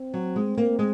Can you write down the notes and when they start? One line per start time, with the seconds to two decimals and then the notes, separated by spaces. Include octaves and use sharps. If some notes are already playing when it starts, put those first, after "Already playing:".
Already playing: C4
0.14 F#3
0.36 G#3
0.57 A#3
0.79 G#3